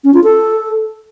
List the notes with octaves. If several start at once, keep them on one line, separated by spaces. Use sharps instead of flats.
C#4
F4
A4